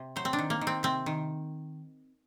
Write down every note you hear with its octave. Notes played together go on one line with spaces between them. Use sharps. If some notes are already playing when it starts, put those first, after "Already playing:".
Already playing: C3
F#3 C5
C4
D4
D#3
A#3
D#3
C4
C3 C4
D#3